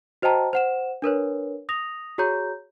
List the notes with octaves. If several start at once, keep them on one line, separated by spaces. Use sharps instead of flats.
F#4 C5 D#5 G5 A5 A#5
C5 F#5 E7
D4 A#4 B4 C#5
D#6 A#6 F7
F#4 G#4 C#5 A#5 G6